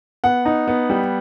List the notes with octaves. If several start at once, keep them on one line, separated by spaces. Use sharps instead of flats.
B3 F#5
D#4
B3
G3